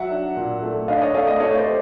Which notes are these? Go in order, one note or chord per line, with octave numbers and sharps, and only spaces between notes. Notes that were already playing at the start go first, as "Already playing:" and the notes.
Already playing: F#3 E5 F#5
D4
A#2
A3
D4 D#5 F5
D5
C#5 D#5
A3 D#5 F5
D#5 F5
A3 C#5 D#5
C5 D5
G4